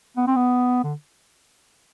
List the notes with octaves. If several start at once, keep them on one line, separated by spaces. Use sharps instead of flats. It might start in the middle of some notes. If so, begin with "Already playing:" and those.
B3
C4
B3
D3